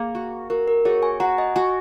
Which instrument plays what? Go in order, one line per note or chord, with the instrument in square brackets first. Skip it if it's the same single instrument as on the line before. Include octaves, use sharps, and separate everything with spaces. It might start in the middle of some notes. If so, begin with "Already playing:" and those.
Already playing: [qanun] A#3 [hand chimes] G#4
[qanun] F#4
[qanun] F#4 [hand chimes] A#4
[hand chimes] A#4
[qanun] F#4 [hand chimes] G#4 C#5
[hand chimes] G#5 C#6
[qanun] F#4 [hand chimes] F#5 A#5
[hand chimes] D#5 G#5
[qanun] F#4 [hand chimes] G#5 C#6